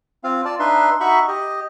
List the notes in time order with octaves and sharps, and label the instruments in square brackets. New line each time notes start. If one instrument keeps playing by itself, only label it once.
[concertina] C4 F4 F5
F4 D5 A5
D4 D#4 B4 E5 C6
D#4 F#4 E5 B5 C#6
G4 D#5